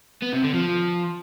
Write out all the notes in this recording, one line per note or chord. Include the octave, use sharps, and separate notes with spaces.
B3
C3
D3
F3